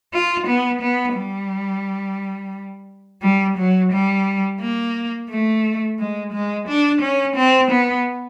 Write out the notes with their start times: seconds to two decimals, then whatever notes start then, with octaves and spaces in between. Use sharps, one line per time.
0.13 F4
0.47 B3
0.81 B3
1.16 G3
3.22 G3
3.57 F#3
3.92 G3
4.60 A#3
5.30 A3
5.99 G#3
6.33 G#3
6.68 D4
7.01 C#4
7.36 C4
7.71 B3